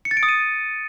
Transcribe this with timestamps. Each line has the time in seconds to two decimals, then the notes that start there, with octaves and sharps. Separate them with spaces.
0.05 C#7
0.11 A6
0.17 D7
0.23 D#6
0.29 D#7